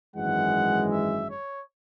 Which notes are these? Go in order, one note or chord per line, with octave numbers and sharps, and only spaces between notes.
G#1 F#2 E3 G#3 F#5
E5
C#5